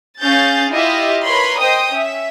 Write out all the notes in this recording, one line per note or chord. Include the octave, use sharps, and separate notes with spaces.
C#4 G#4 F5 G6 A6
E4 F4 G4 D#5 E5
A#4 B4 C#5 B5 C6
C5 D#5 G5 D#6
C#4 E5